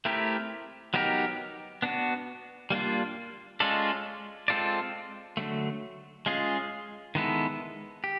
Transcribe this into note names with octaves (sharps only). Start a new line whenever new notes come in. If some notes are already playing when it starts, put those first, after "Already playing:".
A3 C4 E4 G4 A#4
F#3 B3 D#4 G4 A#4
B3 D4 F#4
G3 A#3 D4 F4
G#3 C#4 F4 A4 D5
G#3 C4 F4 A4 D5
D3 F#3 A3
G#3 C#4 F4 G#4
D#3 G#3 B3 E4 A4
G4